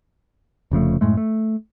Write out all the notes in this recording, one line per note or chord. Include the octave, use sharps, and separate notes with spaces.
F1 C#3 F3 A3
F#2 A2 G#3 A3
A3